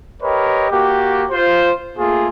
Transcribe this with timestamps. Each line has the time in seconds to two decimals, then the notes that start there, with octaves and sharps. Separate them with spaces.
0.23 G4 A#4 B4 C#5 D#5
0.70 A#3 F#4 G4
1.31 F4 C5
1.98 A3 A#3 F4 G#4